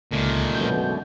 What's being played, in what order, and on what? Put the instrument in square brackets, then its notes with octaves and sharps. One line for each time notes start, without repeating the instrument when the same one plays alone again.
[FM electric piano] C#2 [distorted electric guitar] A#2 D#3 [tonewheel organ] D3 G#3 A3
[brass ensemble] B1 F#2 B2 [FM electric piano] G6